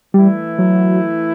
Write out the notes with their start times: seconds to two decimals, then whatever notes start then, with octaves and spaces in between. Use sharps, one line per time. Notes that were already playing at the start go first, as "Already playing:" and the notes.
0.14 E3 G3 A3 E4
0.59 F#3